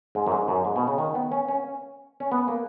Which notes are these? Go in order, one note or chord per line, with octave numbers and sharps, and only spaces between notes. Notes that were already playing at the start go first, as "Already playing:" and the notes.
G#2
F#2
G#2
F#2
G#2
B2
C#3
D#3
B3
C#4
C#4
C#4
B3
A#3